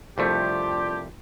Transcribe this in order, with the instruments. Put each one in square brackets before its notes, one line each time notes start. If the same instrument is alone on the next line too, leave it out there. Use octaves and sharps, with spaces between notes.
[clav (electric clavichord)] C2 F2 A3 [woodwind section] D4 F4 G4